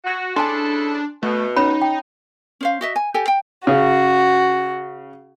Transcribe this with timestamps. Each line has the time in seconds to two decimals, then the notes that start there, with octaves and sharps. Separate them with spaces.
0.05 F#4
0.36 C#3 D4 E4 A4 G#5 A5 C6
1.23 B2 A3
1.56 C#4 D#4 C#5 B5
1.82 G5
2.61 C#4 C5 F5
2.81 F#4 D#5 E5
2.96 G#5
3.14 G4 A4 G5 G#5
3.28 G5
3.67 C#3 C#4 F#4 G#4